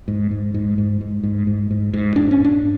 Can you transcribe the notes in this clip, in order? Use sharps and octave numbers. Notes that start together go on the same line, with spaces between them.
G#2
G#2
G#2
G#2
G#2
G#2
G#2
G#2
G#2
G#2 D4
C#4
G#2 D4